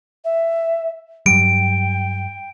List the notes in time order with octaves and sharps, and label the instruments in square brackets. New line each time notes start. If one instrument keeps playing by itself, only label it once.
[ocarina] E5
[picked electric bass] G2 F#3 G3 [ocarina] G5 [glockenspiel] D7